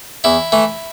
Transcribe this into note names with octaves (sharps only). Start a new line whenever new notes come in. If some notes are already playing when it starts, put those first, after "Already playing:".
E2 E4
E3 A3